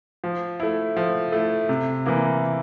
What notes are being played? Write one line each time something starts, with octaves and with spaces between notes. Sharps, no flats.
F3
A3 E4
F3
A3 E4
C3
E3 A#3 E4